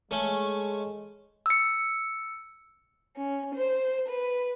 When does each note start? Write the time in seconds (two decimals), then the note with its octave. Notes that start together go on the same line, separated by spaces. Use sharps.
0.11 G#3 A3 C#4
1.46 E6 C#7
3.16 C#4
3.54 C5
4.08 B4